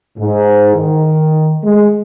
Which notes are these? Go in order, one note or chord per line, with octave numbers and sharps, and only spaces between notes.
G#2
D#3
G#3